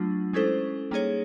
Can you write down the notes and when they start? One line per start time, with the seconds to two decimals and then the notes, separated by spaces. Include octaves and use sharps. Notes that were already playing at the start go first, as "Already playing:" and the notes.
Already playing: F#3 A3 D4 F4
0.33 G#3 C#4 E4 A4 C5
0.91 G3 A#3 D#4 G#4 C#5